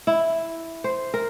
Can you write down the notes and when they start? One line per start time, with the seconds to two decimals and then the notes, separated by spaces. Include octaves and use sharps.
0.07 E4
0.84 C5
1.14 A#4